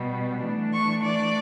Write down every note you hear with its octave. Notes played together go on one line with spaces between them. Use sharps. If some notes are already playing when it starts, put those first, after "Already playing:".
Already playing: B2 G3 B3
E3 A3 D4
C#6
D5